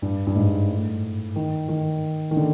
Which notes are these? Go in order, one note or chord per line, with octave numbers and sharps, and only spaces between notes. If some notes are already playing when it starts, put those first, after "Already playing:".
G2
G2
G#2
A2
D#3
D#3
D#3
D3